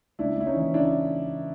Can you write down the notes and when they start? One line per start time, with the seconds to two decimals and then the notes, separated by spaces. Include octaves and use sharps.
0.19 C#2 D4 E4
0.37 C#2 E4
0.46 C#4 D#4
0.56 E3
0.74 C#3 D4 E4